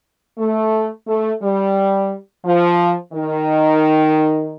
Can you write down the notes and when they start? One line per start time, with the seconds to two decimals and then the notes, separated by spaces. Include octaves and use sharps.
0.39 A3
1.08 A3
1.42 G3
2.45 F3
3.13 D#3